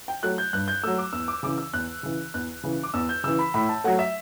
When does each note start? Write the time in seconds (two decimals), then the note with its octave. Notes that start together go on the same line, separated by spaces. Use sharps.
0.08 G5
0.23 F#3 A3 F#6
0.38 G6
0.53 G2 F#6
0.68 G6
0.83 F#3 A3 E6
0.98 D6
1.13 E2 E6
1.28 D6
1.43 C#3 E3 D6
1.58 E6
1.73 E2 F#6
2.03 C#3 E3
2.34 E2 F#6
2.63 C#3 E3
2.83 D6
2.94 E2 E6
3.09 G6
3.24 C#3 E3 E6
3.39 B5
3.54 A2 B5
3.69 A5
3.84 F#3 A3 F#5
3.99 E5